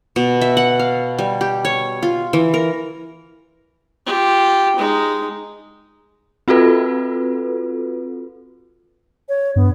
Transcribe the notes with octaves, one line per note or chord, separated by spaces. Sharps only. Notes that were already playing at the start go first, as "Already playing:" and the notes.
B2
E5
F#5
F5
G3
G4
C#5
F4
E3
A#4
F4 G4
G#3 D#4
C4 F4 F#4 A4 B4
C#5
G2 B3